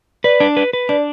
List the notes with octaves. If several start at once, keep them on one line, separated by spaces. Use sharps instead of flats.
B4 D5
D4
B4
B4
D4 D5